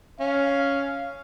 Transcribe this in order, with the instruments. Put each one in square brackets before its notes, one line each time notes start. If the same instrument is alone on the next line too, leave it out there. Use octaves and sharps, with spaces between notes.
[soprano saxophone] C#4 [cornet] F5